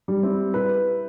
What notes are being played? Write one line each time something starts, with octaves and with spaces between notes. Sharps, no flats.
G3
C4 E4
E4 G4 B4